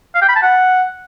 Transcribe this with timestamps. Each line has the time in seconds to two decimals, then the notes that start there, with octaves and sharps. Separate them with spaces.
0.15 F5
0.22 G5
0.29 B5
0.35 A5
0.42 F#5